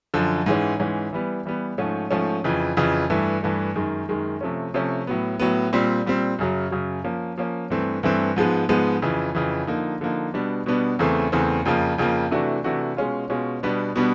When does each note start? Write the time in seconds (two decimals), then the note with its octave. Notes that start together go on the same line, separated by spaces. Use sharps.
0.14 F#2 D3 F3
0.46 G#2 E3 G#3 C#4
0.79 G#2 E3 G#3 C#4
1.13 E3 G3 B3
1.45 E3 G3 B3
1.78 G#2 F3 A3 C#4
2.11 G#2 F3 A3 C#4
2.44 F2 C#3 E3
2.77 F2 C#3 E3
3.10 G2 E3 A3
3.43 G2 E3 A3
3.75 F#2 D#3 G#3
4.09 F#2 D#3 G#3
4.41 C3 F3 A3 C#4
4.74 C3 F3 A3 C#4
5.07 A2 F#3 B3
5.39 A2 F#3 B3
5.73 A#2 G3 C4
6.06 A#2 G3 C4
6.39 F#2 C#3 F#3
6.71 F#2 C#3 F#3
7.04 F3 A#3 C#4
7.38 F3 A#3 C#4
7.70 G2 E3 A3 C4
8.03 G2 E3 A3 C4
8.36 G#2 F3 G#3 B3
8.69 G#2 F3 G#3 B3
9.02 F2 C#3 E3
9.35 F2 C#3 E3
9.67 D3 F3 A#3 D#4
10.01 D3 F3 A#3 D#4
10.34 B2 G3 B3 D4
10.66 B2 G3 B3 D4
10.99 E2 C#3 E3 A3 C4
11.32 E2 C#3 E3 A3 C4
11.65 F2 C#3 F3 A#3
11.98 F2 C#3 F3 A#3
12.31 C3 E3 A3 D4 F#4
12.64 C3 E3 A3 D4 F#4
12.97 B2 G#3 C#4 F4
13.30 B2 G#3 C#4 F4
13.63 B2 G3 B3 D4
13.96 B2 G3 B3 D4